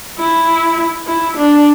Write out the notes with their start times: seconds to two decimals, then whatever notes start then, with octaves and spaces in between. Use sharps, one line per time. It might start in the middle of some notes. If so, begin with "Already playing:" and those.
0.19 E4
1.07 E4
1.37 D4